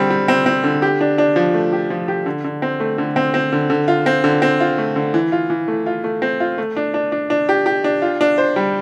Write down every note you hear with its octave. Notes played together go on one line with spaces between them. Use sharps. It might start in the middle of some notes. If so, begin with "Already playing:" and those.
Already playing: D3 G3 C4
G3
C4
C4
D3
G4
D4
D4
F3
A3
G4
F3
G4
D3
D3
C4
A3
D3
C4
C4
D3
D3
F4
C4
D3
C4
F4
A3
D3
E3
F4
E3
A3
F4
A3
C4
F4
A3
D4
D4
D4
D4
G4
G4
D4
F4
D4
C5
G3